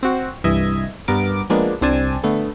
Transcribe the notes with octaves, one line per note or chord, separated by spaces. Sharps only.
C4 F#4
C2 G2 E3 D#5 E5 G#6
G2 B3 A#4 D6
F3 G#3 A#3 B3 D4
C2 C4 D4 G#5 A5
D3 A3 B3